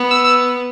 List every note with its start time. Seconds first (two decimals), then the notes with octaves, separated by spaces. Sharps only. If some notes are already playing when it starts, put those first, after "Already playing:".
Already playing: B3
0.11 E6
0.24 E6